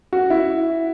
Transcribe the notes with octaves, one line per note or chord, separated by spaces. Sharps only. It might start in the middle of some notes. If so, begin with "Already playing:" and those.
F#4
E4